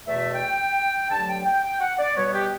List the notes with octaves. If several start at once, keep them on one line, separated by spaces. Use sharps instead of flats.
E2 B2 A3 E5
G5
G2 D3 F#3 A3 A5
G5
G5
G5
F#5
D5
B2 G3 B3 C#5
G4